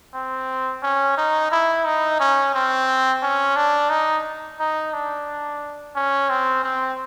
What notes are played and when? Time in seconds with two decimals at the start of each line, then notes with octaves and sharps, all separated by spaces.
0.14 C4
0.83 C#4
1.17 D#4
1.51 E4
1.85 D#4
2.20 C#4
2.54 C4
3.22 C#4
3.56 D4
3.90 D#4
4.59 D#4
4.93 D4
5.95 C#4
6.30 C4
6.64 C4